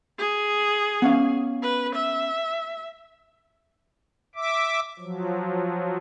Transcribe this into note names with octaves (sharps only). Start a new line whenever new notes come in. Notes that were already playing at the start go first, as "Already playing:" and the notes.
G#4
B3 C#4 F5
B4
E5
E5 D6
F3 F#3